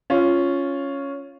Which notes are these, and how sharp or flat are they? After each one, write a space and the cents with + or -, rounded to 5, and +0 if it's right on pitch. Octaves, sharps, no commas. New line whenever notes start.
C#4 +0 F4 -5